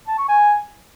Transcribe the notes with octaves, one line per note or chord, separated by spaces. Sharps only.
A5
C#6
G#5